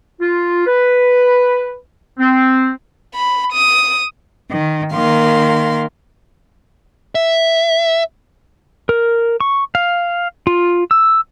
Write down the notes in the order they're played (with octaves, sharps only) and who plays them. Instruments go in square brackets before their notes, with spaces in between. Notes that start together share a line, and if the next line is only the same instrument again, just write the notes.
[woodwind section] F4
B4
C4
[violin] B5
D#6
[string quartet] D#3
D#3 A#3 F5 C6
[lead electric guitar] E5
[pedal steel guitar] A#4
C#6
F5
F4
E6